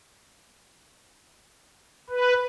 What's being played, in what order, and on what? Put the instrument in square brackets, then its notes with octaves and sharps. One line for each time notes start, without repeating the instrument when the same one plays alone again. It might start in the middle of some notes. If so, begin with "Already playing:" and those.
[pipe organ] B4